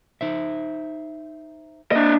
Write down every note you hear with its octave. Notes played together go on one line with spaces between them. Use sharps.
D#4 C5 E5
A#3 D4 D#5 E5